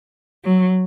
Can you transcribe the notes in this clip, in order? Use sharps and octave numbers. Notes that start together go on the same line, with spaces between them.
F#3